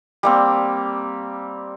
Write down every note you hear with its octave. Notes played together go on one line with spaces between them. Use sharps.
G3 A#3 C4